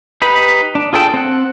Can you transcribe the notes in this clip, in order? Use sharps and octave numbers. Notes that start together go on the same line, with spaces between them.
D#4 G4 B4 B5
D4
F4 G#4 A4 G5 A5
C4 F#5